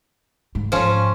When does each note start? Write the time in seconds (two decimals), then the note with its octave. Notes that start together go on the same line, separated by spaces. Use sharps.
0.55 G#2
0.72 F3 C#4